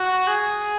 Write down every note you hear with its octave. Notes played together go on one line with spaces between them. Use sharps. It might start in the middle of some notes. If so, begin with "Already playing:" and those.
Already playing: F#4
G#4